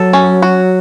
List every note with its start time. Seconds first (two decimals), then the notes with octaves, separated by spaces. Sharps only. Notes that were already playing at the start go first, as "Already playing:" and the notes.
Already playing: F#3 A4
0.13 C#4
0.42 F#4